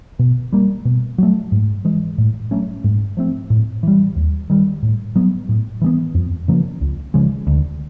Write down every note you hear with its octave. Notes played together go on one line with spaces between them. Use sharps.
B2
G3 A#3
B2
F#3 A3
G#2
E3 G#3
A2
F#3 A3 C#4
G#2
F3 A3 C4
A2
E3 G3
D#2
D#3 G3
A2
F#3 B3
A2
E3 G#3 B3
F2
C#3 F3 A#3
C#2
C#3 F3 G#3
D2